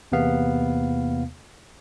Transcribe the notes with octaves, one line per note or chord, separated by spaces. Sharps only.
E2 C3 A#3 B3 F5